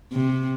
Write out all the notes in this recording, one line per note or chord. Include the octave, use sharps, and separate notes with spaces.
C3